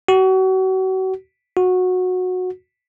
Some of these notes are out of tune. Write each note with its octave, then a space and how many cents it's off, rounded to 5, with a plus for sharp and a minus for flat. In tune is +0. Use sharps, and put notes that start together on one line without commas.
F#4 +35
F#4 -15